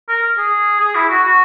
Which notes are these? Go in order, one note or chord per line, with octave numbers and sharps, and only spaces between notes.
A#4
G#4
G#4
E4
F#4
F#4